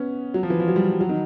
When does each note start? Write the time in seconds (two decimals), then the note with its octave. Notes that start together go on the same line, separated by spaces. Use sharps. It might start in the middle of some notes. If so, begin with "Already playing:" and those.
Already playing: B3 C#4
0.34 F#3
0.43 F3
0.50 E3
0.60 F3
0.68 F#3
0.76 G3
0.92 G3
1.01 F#3
1.09 D#3